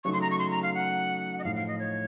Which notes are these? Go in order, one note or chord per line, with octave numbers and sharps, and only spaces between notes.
C#3 F#3 A3 D#4 C#6
C6
A#5
C#6
C6
A#5
F5
F#5
D#5
A2 F3 A3 D#4 F5
F5
D#5
C#5